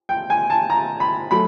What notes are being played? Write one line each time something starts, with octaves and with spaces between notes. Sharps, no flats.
G5
G#5
A5
A#5
B5
F#3 A3 B5